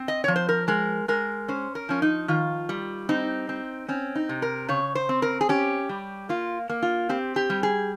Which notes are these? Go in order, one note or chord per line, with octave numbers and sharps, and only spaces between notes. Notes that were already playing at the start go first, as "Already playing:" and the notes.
Already playing: C4
D#5
F3 C#5
C5
A#4
G#3 A#4
G#3 A#4
C#4 C5
A#4
F3 C#4
D#4
D#3 F4
G3
C4 D#4
C4
C4 C#4
D#4
C3
A#4
C#3 C#5
C5
C4
A#4
G#4
C#4 G4
G3
A#3 F4
A#3
F4
C4 G4
G4
G3
G#4